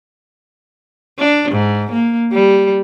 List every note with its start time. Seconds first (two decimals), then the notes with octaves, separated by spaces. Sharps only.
1.19 D4
1.51 G#2
1.92 A#3
2.32 G3